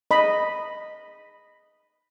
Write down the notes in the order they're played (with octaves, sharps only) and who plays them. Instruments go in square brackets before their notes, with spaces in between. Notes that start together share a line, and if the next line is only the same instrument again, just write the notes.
[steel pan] D#5 B5